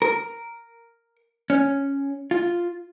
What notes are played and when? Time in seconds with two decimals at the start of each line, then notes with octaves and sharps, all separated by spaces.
0.02 A#4
1.50 C#4
2.31 F4